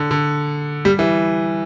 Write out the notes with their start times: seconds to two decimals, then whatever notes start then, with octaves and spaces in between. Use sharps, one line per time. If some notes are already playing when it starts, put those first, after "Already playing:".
Already playing: D3
0.11 D3
0.85 G3
0.99 E3